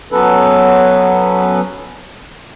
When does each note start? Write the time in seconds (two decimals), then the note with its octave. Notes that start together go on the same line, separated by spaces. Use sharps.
0.12 F#3 B3 C#4 A4 B4